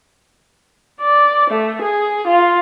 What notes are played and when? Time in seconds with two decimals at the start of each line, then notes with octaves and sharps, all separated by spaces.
1.01 D5
1.50 A3
1.82 G#4
2.27 F4